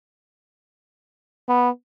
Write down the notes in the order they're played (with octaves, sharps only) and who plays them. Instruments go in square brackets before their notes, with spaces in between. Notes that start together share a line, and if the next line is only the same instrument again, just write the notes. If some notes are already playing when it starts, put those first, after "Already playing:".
[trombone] B3